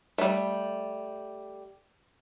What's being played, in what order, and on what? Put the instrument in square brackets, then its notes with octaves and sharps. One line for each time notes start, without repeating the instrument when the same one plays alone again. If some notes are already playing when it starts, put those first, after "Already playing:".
[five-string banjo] G3 A3